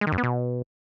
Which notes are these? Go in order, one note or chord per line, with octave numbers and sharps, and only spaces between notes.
G#3
D#3
F#2
B3
B2